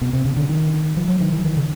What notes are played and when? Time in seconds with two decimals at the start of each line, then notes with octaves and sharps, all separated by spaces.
0.01 B2
0.13 C3
0.25 C#3
0.36 D3
0.49 D#3
0.97 F3
1.08 F#3
1.20 D#3
1.33 E3
1.45 D#3
1.57 C#3